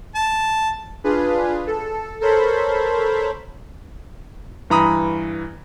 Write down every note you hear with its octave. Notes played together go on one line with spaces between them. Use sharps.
A5
D4 F4 G#4 B4
A4
A4 A#4 C5 C#5 B5
G2 E3 A#5 B5 D#6